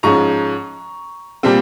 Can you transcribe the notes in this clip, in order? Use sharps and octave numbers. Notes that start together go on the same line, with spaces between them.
G#2 F3 G#3 C#4 A#5 C#6
A#2 G3 C4